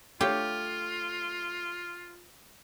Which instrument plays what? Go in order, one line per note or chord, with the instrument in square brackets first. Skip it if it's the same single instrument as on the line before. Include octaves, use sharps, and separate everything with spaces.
[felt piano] A3 C#5 F5 [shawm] F4 [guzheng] G4